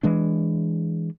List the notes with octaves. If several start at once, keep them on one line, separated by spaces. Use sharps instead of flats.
E3 G#3 D4